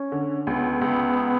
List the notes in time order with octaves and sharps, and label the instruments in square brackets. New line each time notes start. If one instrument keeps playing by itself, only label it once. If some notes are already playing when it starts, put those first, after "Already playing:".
Already playing: [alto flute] C#4
[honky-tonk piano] D3
[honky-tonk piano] C#2 [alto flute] B3
[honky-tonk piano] C#2